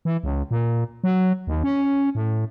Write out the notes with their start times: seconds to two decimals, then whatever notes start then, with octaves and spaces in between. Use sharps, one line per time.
0.05 E3
0.23 C#2
0.51 A#2
1.04 F#3
1.47 D#2
1.64 C#4
2.15 A2